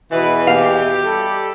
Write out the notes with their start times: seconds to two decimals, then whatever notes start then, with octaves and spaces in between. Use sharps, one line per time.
0.10 E2 B2 E3 B4
0.47 G4 F5
1.03 G3 A4